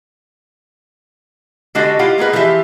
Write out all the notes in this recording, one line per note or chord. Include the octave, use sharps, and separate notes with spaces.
D3 G#3 D4 F#4 G4 D#5
E4 F4 G4 F5 F#5
G#3 A#3 G#4 B4 D#5
E3 F3 F4 G4 E5